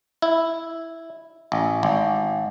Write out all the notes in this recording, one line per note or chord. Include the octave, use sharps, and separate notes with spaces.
E4
A1
G#1